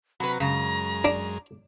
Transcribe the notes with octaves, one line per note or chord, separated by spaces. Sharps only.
C3 F#3 F#4 B4 A#5 B5
F#2 C#3 G#3 A#5
D4